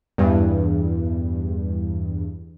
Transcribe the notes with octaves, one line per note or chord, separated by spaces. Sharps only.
E2 G2